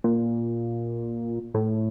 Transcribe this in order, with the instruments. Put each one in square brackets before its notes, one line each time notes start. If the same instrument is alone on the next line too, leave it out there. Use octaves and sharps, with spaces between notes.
[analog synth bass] A#2
A2